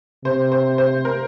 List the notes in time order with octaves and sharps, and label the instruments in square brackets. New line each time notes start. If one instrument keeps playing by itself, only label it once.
[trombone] C3 [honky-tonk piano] C5
[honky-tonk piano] C5
C5
A#4